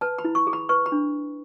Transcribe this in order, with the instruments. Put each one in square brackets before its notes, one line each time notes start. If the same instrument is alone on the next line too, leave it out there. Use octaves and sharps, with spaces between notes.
[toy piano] B4 A5
B5
E4
C#6
G#4
B5
B4 C#6
B5
D4